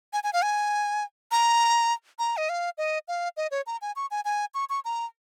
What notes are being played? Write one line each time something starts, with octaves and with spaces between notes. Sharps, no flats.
G#5
G#5
F5
G#5
A#5
A#5
D#5
F5
D#5
F5
D#5
C#5
A#5
G#5
C#6
G#5
G#5
C#6
C#6
A#5